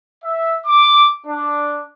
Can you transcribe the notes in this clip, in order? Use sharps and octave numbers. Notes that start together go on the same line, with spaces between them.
E5
D6
D4